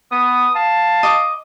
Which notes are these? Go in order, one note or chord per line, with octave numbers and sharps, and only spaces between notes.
B3 D#6
F5 A5
D#5 D6